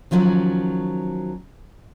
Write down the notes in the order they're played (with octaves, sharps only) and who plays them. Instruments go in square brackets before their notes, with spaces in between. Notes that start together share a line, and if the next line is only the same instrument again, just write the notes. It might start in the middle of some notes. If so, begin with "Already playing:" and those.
[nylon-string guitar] D#3 F3 F#3 C#4